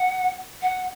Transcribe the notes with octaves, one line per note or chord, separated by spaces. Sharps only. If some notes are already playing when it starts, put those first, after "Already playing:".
Already playing: F#5
F#5